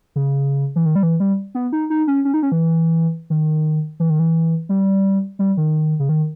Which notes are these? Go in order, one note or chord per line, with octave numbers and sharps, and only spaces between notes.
C#3
E3
D#3
G3
E3
G3
B3
D#4
D#4
C#4
C#4
D#4
C#4
E3
D#3
E3
D#3
E3
G3
G3
D#3
C#3
D#3